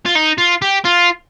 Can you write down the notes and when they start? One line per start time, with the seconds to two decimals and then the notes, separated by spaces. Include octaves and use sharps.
0.06 F4
0.16 D#4
0.38 F4
0.62 G4
0.85 F4